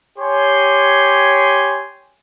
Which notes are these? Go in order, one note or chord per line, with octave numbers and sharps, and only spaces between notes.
G4 C#5 G#5 C6